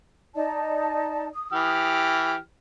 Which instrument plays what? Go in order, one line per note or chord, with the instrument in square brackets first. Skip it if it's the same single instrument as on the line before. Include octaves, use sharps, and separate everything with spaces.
[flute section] D#4 D5 A5
D#6
[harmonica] E3 G4 F6